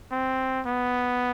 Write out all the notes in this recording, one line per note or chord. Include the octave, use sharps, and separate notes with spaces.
C4
B3